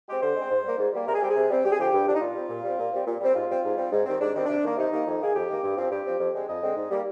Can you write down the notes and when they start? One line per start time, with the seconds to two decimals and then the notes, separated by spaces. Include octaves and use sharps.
0.08 G#3 C4 G4
0.22 D3 C5
0.36 G#3 C4
0.51 G#2
0.64 G3 A#3
0.78 G#2
0.93 G3 A#3
1.07 C3 A#4
1.14 G#4
1.22 G3 C4 G4
1.29 G#4
1.36 C3
1.50 G3 C4
1.64 G2 G4
1.72 G#4
1.78 D3 F3 G4
1.93 G2
2.07 D3 F3 D4
2.14 D#4
2.21 A#2 F4
2.35 G3 C4
2.49 A#2
2.64 G3 C4
2.79 A#2
2.93 G3 C4
3.06 A#2
3.21 G3 C4
3.35 G#2 F4
3.49 G3 C4
3.64 G#2
3.77 G3 C4
3.91 G#2
4.06 D#3 G3 C4
4.20 G#2 D4
4.35 D#3 G3 C4
4.44 C3 D4
4.64 D#3 A#3
4.77 C3 D#4
4.92 D#3 A#3
5.06 F2
5.21 D#3 A#3 G#4
5.34 F2 G4
5.49 D#3 A#3
5.63 G2
5.77 F3 C4
5.91 G2 G4
6.05 F3 C4
6.19 F2
6.33 D3 G#3 C4
6.48 F2 D#5
6.62 D3 G#3 C4
6.76 G#2
6.91 G3 A#3